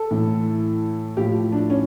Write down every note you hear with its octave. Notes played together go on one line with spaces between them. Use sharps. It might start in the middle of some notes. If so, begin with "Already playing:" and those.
Already playing: A4
A2 E3
A2 F3 G4
D4
C#4